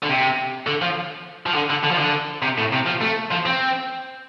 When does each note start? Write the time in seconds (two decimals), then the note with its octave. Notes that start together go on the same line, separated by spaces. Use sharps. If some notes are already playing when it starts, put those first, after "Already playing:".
0.03 D3
0.09 C3
0.67 D3
0.82 F3
1.46 F3
1.55 D3
1.70 D3
1.84 D3
1.91 F3
1.98 D3
2.42 C3
2.58 A2
2.73 C3
2.86 F3
3.01 A3
3.32 F3
3.46 C4